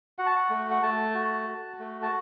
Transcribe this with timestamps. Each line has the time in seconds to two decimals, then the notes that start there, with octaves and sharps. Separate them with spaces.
0.19 F#4 F#5
0.26 A5
0.36 F#5
0.50 A3
0.71 F#5
0.82 A3 A5
1.15 F#4
1.47 F#4
1.79 A3
2.02 A5